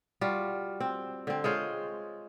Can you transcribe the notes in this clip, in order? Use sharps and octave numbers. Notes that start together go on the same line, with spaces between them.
G3 F4 F#4
C4
D3 C4
G#3 F4 C5 C#5